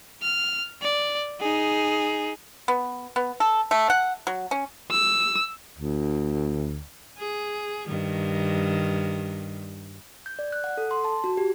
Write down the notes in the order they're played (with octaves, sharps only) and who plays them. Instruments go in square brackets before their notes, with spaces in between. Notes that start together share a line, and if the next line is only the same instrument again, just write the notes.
[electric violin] F6
D5
D#4 G#4
[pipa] B3
B3
A4
A3
F#5
F#3
C#4
[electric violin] E6
[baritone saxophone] D2
[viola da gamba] G#4
G2 D#3
[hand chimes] G6
D5
F#6
F#5
A4
C6
A5
F#4
G4